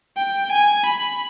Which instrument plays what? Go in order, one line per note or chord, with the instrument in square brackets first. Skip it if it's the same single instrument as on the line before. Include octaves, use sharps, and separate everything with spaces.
[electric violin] G5
G#5
B5